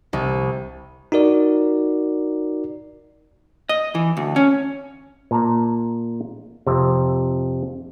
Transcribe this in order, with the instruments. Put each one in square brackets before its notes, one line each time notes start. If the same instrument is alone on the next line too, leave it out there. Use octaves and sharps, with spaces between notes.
[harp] C2
[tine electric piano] D#4 F#4 A#4 D5
[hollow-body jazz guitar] D#5
E3
D2
C#4
[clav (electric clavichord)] A#2 A5 A#5
F2 C3